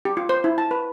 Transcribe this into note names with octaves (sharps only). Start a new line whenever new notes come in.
G4
F4
C5
E4
A5
B4